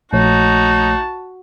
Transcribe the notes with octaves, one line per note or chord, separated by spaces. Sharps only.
A#1 A3 D#4 F#4 C#5 A5